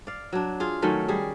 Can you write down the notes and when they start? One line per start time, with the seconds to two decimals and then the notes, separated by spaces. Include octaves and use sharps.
0.07 D5 F5
0.33 F#3 D4
0.60 F4 G#4
0.82 D#3 F#3 A3 C#4
1.08 G3 G#4